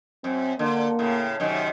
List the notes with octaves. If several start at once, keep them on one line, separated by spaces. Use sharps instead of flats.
F#2 C4
D3 A#3
A2 C#3
F#2 C3 D#3